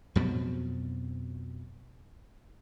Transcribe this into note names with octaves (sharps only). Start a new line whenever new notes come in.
F2 B2 F3 F#3